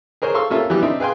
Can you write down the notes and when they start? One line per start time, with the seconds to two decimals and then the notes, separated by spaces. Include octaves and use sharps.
0.22 G#4 A#4 C5 C#5 G#5
0.34 A4 F5 C6 C#6 E6
0.50 C3 A#3 C#4 F4 A4 E5
0.70 E3 F#3 G3 B3 G4
0.83 C4 D4 D#4 E5
1.00 G#4 B4 F5 G5 G#5 C6